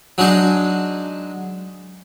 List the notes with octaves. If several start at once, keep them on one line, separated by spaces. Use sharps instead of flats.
F#3 G#3 D4 D#4